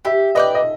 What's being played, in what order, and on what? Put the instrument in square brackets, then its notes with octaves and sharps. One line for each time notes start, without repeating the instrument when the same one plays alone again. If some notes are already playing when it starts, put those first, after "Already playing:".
[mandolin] G4 [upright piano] E5
[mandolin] B4 D5 G5 [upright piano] D#5
[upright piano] D#5